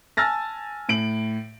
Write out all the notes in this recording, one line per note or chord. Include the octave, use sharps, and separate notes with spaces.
G#5 A5 E6 F6 A6 A#6
A2 D7 F#7